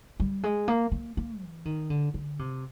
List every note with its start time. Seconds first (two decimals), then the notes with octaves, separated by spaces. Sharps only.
0.20 G3
0.43 G#3
0.68 A#3
0.92 A#3
1.17 A#3
1.41 E3
1.65 D#3
1.90 D3
2.14 D3
2.39 C3